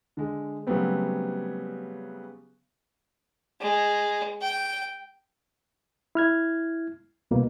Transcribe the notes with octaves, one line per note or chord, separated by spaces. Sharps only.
D3 G#3
C#3 F#3 G3 A3 B3 C4
G#3
G5
E4 F6 G#6
C2 B2 A#3